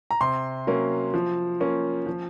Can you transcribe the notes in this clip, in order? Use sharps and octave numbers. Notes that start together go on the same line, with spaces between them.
A#5
C3 C6
F#3 A#3 C#4
F3
A#3 C#4
F3